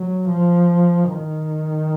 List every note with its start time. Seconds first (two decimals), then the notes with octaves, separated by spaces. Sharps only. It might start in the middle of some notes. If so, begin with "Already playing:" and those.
Already playing: F#3
0.30 F3
1.11 D#3